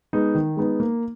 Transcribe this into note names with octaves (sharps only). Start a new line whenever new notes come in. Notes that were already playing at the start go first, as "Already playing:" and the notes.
G#3 B3 D#4
D#3
G#3 B3 D#4
A#3